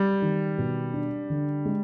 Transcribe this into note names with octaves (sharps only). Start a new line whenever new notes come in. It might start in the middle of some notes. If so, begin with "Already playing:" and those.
Already playing: G3
D#3
B2
D4
D3
G#3